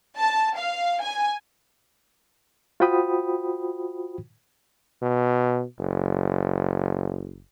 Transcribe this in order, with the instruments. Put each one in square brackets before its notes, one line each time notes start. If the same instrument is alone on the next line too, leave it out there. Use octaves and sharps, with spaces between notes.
[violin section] A5
F5
G#5
[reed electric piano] F4 F#4 C5 G5 B5 D#6
[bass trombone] B2
F#1